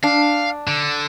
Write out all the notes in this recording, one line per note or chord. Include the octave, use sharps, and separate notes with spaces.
D4 F5
D3